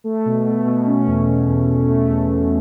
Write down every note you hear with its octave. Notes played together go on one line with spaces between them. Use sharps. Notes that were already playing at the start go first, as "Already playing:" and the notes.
A3
B2
A3
B2
C#4
E2
B2
E2
C#4
A3
E2
B2